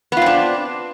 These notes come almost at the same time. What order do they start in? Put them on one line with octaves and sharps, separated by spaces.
B3 F4 C4 D4